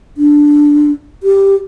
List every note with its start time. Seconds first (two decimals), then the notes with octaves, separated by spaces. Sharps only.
0.17 D4
1.23 G4